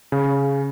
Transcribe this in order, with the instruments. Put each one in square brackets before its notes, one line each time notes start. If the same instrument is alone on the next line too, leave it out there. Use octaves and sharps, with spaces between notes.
[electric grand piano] C#3